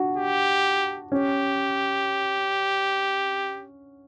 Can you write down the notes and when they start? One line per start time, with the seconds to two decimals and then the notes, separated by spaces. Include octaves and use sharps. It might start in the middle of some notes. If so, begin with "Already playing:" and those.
Already playing: D4 F#4
0.17 G4
1.11 C#4 G4